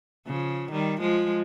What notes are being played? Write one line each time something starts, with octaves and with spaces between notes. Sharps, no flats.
C#3 F3
D#3 G3
F3 G#3